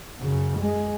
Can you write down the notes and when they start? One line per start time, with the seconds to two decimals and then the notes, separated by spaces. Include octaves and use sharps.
0.19 F#2 C#3
0.58 G#3